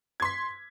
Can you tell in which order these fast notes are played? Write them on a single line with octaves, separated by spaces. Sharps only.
G#6 C6 B6